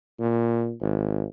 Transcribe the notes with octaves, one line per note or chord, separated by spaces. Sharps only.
A#2
G#1